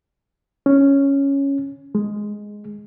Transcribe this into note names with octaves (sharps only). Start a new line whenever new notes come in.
C#4
G#3